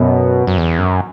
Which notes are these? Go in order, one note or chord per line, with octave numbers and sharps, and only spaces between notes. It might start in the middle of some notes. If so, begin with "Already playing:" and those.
Already playing: F#2 B2
F#2
E2
F#2